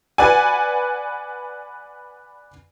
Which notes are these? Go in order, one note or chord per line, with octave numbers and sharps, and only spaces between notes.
B4 D5 F#5 G#5